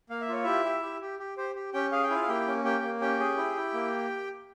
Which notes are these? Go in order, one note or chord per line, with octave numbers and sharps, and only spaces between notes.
A#3 F5
E5
F4 C#5
E4 G4 E5
G4
G4
G4
G4
G4 C5
G4
C#4 G4 G5
G#4 F5
G5
E4 F4 F5
F5
A#3 G4 G5
C#4
A#3 G4 G5
A#3
C#4 G4 G5
G#4
E4
E4
A#3